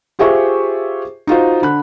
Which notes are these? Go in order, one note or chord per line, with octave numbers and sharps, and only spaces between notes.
F4 G4 G#4 C5 E5 C#6
D#4 F4 F#4 C5
D3 B5 F#6